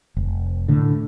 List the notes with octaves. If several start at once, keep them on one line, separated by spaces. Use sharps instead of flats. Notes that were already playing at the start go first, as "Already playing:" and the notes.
F1
A2 D3